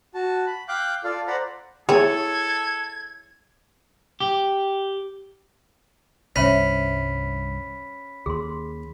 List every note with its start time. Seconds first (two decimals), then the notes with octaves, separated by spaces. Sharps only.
0.14 F#4 A5
0.47 B5
0.68 F5 G5 D6 F#6 G6
1.04 F4 A4 D5 F5
1.27 C5 D5 F#5 A#5 B5
1.89 E4 G#4 A4 C#5 G#6
4.20 G4
6.36 C2 G2 C#4 C5 E5 B5 B6
8.26 D#2 G#4 C6